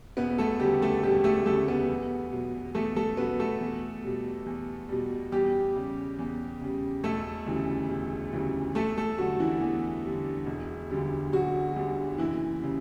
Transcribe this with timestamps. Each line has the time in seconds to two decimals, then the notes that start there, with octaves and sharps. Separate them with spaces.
0.17 E1 B3 B4
0.38 A3 A4
0.60 D2 C#3 G3 G4
0.82 A3 A4
1.03 E1 G3 G4
1.24 A3 A4
1.46 D2 C#3 G3 A3 A4
1.68 B3 B4
1.89 E2
2.32 B2 F#3
2.75 E2 A3 A4
2.96 A3 A4
3.17 B2 F#3 B3 B4
3.39 A3 A4
3.61 E2
4.03 B2 G3
4.46 E2
4.89 B2 G3
5.32 E2 G3 G4
5.75 C#3 G3
6.19 E2
6.61 C#3 G3
7.03 E1 A3 A4
7.46 D2 C#3 E3 G3
7.89 E1
8.32 D2 C#3 E3 G3
8.75 E2 A3 A4
8.97 A3 A4
9.18 D3 F#3 G3 F#4
9.40 E3 E4
9.61 E2
10.04 D3 G3
10.47 E1
10.90 D2 D3 G3
11.32 E1 F#3 F#4
11.76 D2 D3 G3
12.18 F#1 E3 E4
12.61 C#3 G3